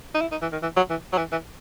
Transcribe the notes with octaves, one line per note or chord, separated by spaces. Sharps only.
D#4
E4
D#4
E3
D#3
E3
F#3
E3
F#3
E3
E3